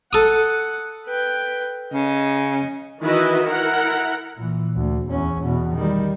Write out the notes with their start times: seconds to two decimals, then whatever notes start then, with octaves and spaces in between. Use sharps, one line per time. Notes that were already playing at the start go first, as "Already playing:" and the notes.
0.13 A4 F#5 D#6
1.06 B4 G5
1.93 C#3 D#5
3.01 D#3 E3 E4 F#4 B4 D#5
3.42 E4 A#4 F#5
4.37 A#2 E3
4.76 D2
5.10 E2 C#4
5.43 E2 B2
5.75 D#3 G3